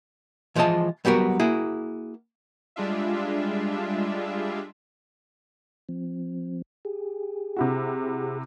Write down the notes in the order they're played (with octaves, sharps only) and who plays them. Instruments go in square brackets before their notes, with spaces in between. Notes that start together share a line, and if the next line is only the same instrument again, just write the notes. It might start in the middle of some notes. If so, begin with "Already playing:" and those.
[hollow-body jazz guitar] E3 F3 G#3 F4 D#5 A5
F#3 G3 B3 F#4 A#4
A#3 E4 F#4 G#4
[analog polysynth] G3 G#3 D4 F4 E5
[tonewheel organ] F3 C4
G4 G#4
[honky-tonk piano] C3 E4 F#4